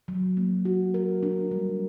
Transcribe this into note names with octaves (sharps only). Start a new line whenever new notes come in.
F#3
A#3
F#4
A#4
D4
G3